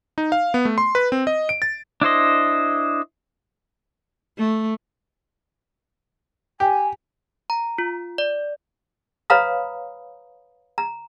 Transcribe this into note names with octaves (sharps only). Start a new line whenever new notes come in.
D#4
F5
B3
A3
C6
B4
C4
D#5
D7
A6
D4 E4 C5 D#5
A3
G4 G#5
A#5
F4
D5
B4 C#5 F5 A#5 B5 D#6
A#5